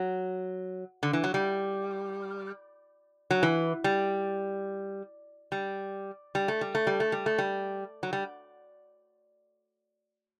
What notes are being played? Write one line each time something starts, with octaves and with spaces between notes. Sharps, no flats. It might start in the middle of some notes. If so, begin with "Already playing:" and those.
Already playing: F#3
D3
E3
F#3
G3
F#3
E3
G3
G3
G3
A3
G3
A3
G3
A3
G3
A3
G3
F#3
G3